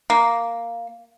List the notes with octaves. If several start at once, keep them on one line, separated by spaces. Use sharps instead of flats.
A#3